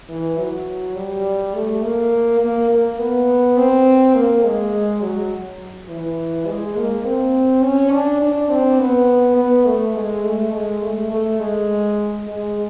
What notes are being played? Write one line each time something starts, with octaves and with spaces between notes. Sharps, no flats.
E3
F#3
G3
A3
A#3
A#3
A#3
B3
C4
A#3
G#3
F#3
E3
G#3
A#3
C4
C#4
D4
D4
C4
B3
B3
A3
G#3
A3
G#3
A3
A3
G#3
G#3